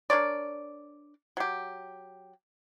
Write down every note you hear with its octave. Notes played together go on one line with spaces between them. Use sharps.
D4 A#4 C#5 D5
F#3 G4